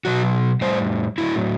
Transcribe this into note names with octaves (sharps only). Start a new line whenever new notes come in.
B2 F#3 F#4
A2 G3 C5
A2 F#3 E4